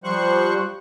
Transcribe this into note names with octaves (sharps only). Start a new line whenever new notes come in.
F3 G3 C5 C#6 F#6